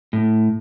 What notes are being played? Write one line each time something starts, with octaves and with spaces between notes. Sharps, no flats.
A2